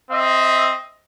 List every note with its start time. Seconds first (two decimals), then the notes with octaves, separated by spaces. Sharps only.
0.11 C4 D#5 E5